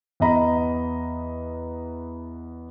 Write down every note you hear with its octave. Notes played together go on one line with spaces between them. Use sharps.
E2 B3 D#5 A#5 B5